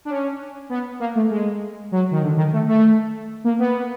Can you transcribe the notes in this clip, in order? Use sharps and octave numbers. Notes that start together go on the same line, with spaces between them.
D4
C#4
B3
A#3
A3
G#3
F#3
D#3
D3
D#3
A3
A3
A#3
B3